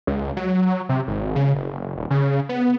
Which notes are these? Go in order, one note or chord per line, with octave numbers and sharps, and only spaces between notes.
C#2
F#3
C3
G#1
C#3
F#1
D#1
C#3
B3